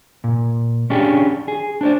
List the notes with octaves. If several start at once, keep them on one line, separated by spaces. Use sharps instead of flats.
A#2
C#4 D4 G4 G#4
G#4
D4 C5 D5